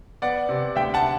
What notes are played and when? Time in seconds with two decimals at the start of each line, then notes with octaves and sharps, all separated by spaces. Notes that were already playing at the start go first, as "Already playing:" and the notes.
0.22 B3 D5 F#5
0.49 C3
0.76 D2 E5 G5
0.94 F#5 A5